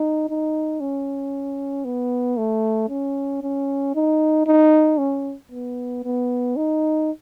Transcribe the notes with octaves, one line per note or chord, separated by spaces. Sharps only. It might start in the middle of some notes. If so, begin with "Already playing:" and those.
Already playing: D#4
D#4
C#4
B3
A3
C#4
C#4
D#4
D#4
C#4
B3
B3
D#4